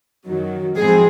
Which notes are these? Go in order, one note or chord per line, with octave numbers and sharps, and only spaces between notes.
F#2 D#3 F#3
A2 F3 G#3 C4 G#4